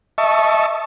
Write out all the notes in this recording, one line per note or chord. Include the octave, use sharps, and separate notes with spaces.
D#5 E5 A5 C#6